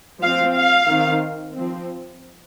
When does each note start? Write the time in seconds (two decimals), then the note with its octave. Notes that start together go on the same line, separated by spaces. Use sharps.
0.22 F3 C4 F5
0.55 F5
0.88 D#3 C4
1.55 F3 C4